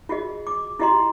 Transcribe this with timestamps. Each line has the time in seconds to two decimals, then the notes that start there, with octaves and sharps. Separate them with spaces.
0.09 F4 F#4 G#4 D#5
0.47 D6
0.79 E4 F4 G4 D#5 A#5 C6